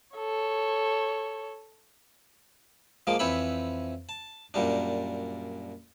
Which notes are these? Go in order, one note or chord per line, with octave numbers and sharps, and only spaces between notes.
A4 C#5
F3 G#3 A#3 D6
F2 E3 C4 C#5 E5 B5
A5
F#2 A#2 G3 D4